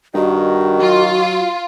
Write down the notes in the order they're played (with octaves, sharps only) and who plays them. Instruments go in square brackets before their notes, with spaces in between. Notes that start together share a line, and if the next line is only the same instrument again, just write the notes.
[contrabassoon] G2 [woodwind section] D#3 [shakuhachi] F#4
[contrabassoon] F#3 [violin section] F4